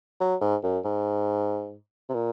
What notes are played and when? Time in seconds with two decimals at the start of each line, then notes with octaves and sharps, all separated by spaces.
0.20 F#3
0.41 G#2
0.63 F#2
0.85 G#2
2.09 C3
2.15 A#2